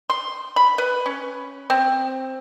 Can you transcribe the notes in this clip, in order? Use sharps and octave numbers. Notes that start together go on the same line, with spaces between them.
C6
B5
B4
C#4
C4